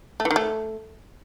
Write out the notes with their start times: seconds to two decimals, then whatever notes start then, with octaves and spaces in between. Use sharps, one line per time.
0.20 A3
0.25 E3
0.31 D#3
0.36 A3